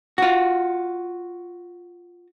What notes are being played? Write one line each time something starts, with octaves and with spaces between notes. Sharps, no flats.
F4 F#4